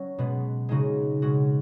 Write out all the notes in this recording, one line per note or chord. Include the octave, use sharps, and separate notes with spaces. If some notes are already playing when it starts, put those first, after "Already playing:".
Already playing: F#3 C#4
B2 G#3 B3
C#3 G#3 D#4 F#4
B2 G#3 C#4 F#4